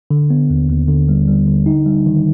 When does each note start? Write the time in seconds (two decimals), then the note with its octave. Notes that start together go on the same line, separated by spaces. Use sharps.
0.11 D3
0.30 B3
0.50 D#2
0.69 D#2
0.88 D3
1.09 G3
1.28 G3
1.47 D3
1.66 D#4
1.86 G3
2.06 D#3